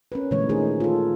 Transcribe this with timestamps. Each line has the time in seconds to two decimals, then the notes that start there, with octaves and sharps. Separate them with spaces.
0.12 C#4 A#4 B4
0.31 A#2 D3 E3 G#3 A3 C#5
0.49 D#3 A3 D#4 G#4 A#4 C5
0.80 F4 A4